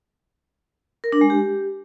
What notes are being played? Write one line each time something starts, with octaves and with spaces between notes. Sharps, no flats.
A#4
D4
G#3
G4